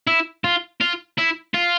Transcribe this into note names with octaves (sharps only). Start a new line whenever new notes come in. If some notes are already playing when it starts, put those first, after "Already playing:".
E4
F4
F4
E4
F4